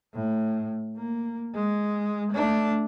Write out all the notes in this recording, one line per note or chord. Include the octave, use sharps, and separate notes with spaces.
A2
A#3
G#3
A3 D4